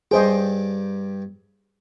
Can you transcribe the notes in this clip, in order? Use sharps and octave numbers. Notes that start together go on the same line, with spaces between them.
G2 G3 G#4 C5 D#5 G5